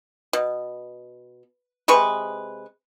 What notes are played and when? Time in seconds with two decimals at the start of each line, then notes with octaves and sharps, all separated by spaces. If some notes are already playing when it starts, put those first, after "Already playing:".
0.33 B2
1.88 C3 G#3 B4 C#6